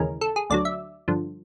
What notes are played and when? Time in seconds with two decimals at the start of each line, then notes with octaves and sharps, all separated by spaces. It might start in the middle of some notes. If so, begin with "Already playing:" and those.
Already playing: D#2 C#3 E3 G#3 C#4 A#4
0.21 A4
0.36 G#4
0.50 D2 D3 F#3 D5
0.65 E5
1.08 G2 D3 F3